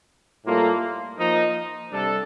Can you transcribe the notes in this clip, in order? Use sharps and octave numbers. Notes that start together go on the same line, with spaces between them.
A2 G3 A#3 F4 A4
F3 A#3 D#4
C3 G3 D4 A4